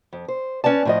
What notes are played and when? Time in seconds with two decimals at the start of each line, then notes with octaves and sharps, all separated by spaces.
0.13 F2
0.28 C5
0.64 C#4 B4 D5 A5
0.85 A2 F3 D#5